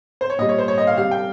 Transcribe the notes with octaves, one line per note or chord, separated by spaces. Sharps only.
C5
C#5
A#2 G3 D#5
C#5
C5
C#5
D#5
F5
C3 G3 F5
G5